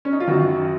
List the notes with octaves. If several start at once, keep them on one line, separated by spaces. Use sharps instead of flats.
C#4
D#4
F4
F#2 D#3 F#4